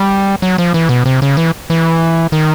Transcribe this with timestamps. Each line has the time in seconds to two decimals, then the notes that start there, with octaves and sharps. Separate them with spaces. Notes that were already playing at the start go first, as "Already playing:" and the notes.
Already playing: G3
0.42 F#3
0.58 F3
0.74 E3
0.89 B2
1.06 C3
1.22 C#3
1.37 E3
1.70 E3
2.32 D#3